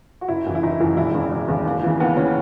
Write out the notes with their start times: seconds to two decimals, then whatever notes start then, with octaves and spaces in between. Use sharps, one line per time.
0.21 F#4
0.28 F#1 E4
0.46 F#2 E3
0.55 E4
0.63 F#1 D#4
0.80 F#2 E3
0.97 E1 E4
1.14 E2 C#3
1.32 E1
1.48 E2 C#3
1.65 D#2
1.83 C#3 E3
2.00 D#2 B3
2.16 C#3 E3 C#4